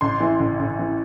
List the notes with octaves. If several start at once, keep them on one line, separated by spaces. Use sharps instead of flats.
A1 C6
E3
A1
A1
E3